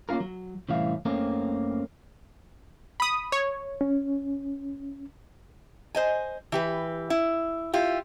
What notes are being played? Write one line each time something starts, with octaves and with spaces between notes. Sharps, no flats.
A#3 C#4 E4 F4 A#4
F#3
C2 A2 E3 C#4 E4 F5
F#2 A3 A#3 C4 C#4 A#4
B5 D#6
C#5
C#4
C5 D#5 G#5
E3 G4 B4
E4
E4 F4 G4